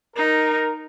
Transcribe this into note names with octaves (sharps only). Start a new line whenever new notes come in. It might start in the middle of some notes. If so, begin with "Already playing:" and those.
D#4 A#4